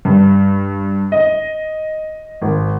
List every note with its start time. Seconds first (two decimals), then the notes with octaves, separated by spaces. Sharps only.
0.05 G2
1.12 D#5
2.42 G#1